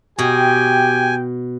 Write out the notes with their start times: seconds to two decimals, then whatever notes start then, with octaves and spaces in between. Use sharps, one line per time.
0.19 B2 G4 G5 G#5